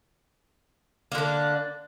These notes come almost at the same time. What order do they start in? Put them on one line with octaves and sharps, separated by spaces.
A#3 D3 D4